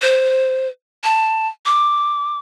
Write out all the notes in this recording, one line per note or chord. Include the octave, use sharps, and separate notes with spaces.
C5
A5
D6